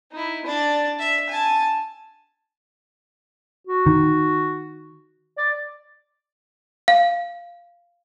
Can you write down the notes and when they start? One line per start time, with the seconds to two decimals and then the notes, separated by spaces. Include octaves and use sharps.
0.12 D#4 E4
0.45 D4 D5
0.99 E5
1.29 G#5 A5
3.67 F#4
3.86 D#3
5.38 D5
6.88 F5